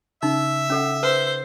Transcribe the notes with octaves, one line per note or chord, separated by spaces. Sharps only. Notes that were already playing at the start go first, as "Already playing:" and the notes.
C#3 D#4 E5
C#4 A4 F#5
B4 C5